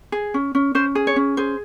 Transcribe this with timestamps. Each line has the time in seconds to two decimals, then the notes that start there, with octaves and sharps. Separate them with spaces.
0.12 G#4
0.34 C#4
0.55 C#4
0.75 C#4 C5
0.95 G#4
1.07 C#5
1.16 C#4
1.37 G#4 C5